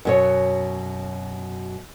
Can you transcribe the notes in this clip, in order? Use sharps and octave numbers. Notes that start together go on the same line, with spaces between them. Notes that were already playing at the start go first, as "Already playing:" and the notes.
F#2 B2 C#5